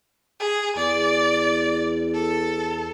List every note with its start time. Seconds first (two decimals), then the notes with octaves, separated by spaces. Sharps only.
0.40 G#4
0.77 E2 D5
2.14 A4